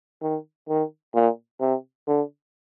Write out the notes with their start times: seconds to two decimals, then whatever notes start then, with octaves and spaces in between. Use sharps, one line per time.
0.22 D#3
0.69 D#3
1.14 A#2
1.60 C3
2.07 D3